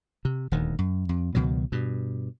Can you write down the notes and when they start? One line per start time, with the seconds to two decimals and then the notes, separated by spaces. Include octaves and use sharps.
0.25 C3
0.52 D#1 D2 D#3
0.79 F#2
1.09 F2
1.35 C#2 B2 D#3 F#3
1.72 G2 B2